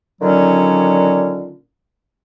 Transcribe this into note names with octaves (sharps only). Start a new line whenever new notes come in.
A#2 D3 D#3 F#3 C#4